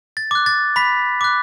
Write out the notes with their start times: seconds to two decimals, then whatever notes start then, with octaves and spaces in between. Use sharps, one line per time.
0.17 A6
0.31 D6 F#6
0.46 A6
0.76 B5 B6
1.21 D6 F#6